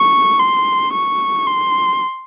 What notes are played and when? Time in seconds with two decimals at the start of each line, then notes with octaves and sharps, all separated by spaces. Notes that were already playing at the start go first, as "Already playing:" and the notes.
Already playing: C#6
0.39 C6
0.93 C#6
1.47 C6